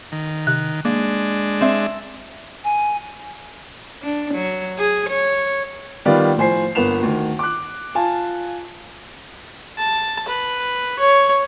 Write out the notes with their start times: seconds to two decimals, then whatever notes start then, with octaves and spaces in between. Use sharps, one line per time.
0.12 D#3
0.47 C3 F#6
0.85 G#3 A#3 D4
1.61 C4 E5
2.64 G#5
4.03 D4
4.35 F#3
4.79 G#4
5.10 C#5
6.05 D#3 G3 B3 F4 D5
6.37 A2 F3 C5 G#5 C7
6.75 G1 A#3 B3 E7 F7
7.03 D2 D#3
7.39 D6 F#6
7.95 F4 G#5 A5
9.78 A5
10.28 B4
10.99 C#5